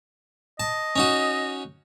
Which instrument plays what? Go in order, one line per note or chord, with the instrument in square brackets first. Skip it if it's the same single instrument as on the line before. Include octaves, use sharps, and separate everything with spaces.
[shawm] D#5 [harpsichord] A5
[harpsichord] C#4 D#4 F#4